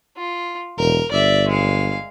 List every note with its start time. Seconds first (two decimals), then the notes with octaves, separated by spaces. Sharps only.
0.17 F4
0.78 E1 A#4
1.11 G1 D5 E5
1.48 G#3 F5